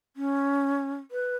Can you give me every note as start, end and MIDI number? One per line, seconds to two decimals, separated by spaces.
0.16 0.96 61
1.11 1.36 71